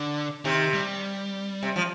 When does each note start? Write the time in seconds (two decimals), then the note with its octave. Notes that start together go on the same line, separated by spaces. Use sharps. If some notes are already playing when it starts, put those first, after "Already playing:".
Already playing: D3
0.45 C3 D#3
0.74 G3
1.63 C3
1.76 F3